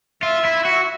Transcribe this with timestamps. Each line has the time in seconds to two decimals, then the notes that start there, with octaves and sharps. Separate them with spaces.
0.23 F4 E5
0.45 E4
0.65 F#4